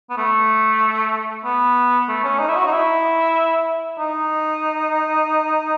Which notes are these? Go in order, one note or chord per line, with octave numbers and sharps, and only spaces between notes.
B3
A3
B3
A3
C#4
D#4
E4
F#4
D#4
E4
D#4